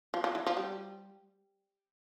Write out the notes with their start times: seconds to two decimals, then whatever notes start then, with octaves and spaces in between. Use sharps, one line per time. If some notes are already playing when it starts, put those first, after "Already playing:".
0.14 F3
0.24 F3
0.35 E3
0.47 F3
0.57 G3